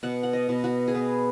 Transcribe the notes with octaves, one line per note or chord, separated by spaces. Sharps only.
B2 F#5
F#5
D#5
B2
F#4
G#4
B3 B4